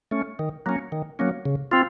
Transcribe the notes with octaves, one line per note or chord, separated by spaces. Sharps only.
A3 C#4
D#3
F#3 A#3 C#4
D#3
F#3 A#3 C#4
C#3
C4 F4